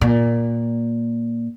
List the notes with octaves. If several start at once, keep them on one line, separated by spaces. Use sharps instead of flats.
A#2